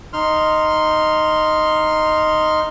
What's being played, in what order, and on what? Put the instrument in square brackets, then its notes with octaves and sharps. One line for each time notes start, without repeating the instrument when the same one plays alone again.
[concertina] D#4 C6 F6